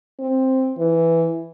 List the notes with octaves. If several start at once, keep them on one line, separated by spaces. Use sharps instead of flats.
C4
E3